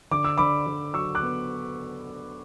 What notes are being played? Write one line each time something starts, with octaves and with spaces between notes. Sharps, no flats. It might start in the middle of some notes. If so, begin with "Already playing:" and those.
D3 D6
E6
D3 B5 D6
D3
F#3 C#6 E6
D6 F#6
B3